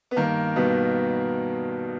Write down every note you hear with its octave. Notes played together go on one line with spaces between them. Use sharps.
B3
G2 D#3 A#3
G2 B2 D#3 B3